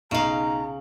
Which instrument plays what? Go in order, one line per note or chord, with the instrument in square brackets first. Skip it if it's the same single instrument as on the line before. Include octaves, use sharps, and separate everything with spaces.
[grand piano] B1 D#4 F#7 [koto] C#3 F5 [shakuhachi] A#5